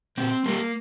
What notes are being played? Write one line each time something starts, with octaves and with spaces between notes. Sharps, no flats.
A#2 C4
G3 A#3